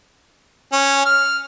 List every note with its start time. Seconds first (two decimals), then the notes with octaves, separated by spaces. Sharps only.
0.72 C#4
1.05 F6